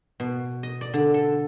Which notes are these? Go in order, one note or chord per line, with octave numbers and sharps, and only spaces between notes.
B2
D#5
D5
D3
A4